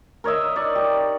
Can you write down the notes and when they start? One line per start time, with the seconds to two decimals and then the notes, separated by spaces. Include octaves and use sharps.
0.24 A#4 C#5 D#5 E5
0.56 D#4 D5 C#6
0.75 G4